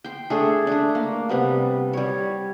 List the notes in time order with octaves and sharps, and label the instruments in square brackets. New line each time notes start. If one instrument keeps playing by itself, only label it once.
[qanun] G5 C6
A3 D4 G#4 A4
A3 D4
A#3
C3 G3 B3
G3 C#5